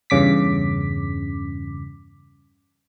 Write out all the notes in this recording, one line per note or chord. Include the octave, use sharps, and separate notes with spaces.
E2 G2 C#3 D6 B6